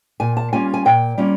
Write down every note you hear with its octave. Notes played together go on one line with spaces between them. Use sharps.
A#2 G#5
A5
G3 A#3 C#4 F4 G#5
G#5
A#2 G5
G3 A#3 C#4 F4